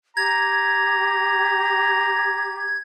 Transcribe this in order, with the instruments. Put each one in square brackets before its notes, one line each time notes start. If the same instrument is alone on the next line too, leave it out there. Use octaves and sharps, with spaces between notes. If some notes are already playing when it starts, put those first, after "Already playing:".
[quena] G4 [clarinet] A#5 [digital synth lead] G#6